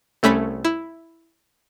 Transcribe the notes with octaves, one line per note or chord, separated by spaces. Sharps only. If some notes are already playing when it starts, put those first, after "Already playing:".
C2 A3 C#4 B5 B6
E4